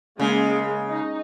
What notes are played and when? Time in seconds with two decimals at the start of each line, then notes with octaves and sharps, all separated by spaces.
0.19 C#3 G#3 A#3
0.88 D#4